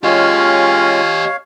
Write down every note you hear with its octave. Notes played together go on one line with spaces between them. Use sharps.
G#3 C#4 F4 G4 C#5 D#5 F5